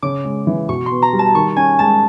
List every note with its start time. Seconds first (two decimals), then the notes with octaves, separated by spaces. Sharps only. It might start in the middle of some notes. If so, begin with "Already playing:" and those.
0.03 C#3 D6
0.25 G#3
0.47 E3
0.69 B2 C#6
0.86 B3 C6
1.02 A#5
1.13 G3
1.19 A5
1.35 D#3 C#6
1.56 C#4 G#5
1.79 G#3 A5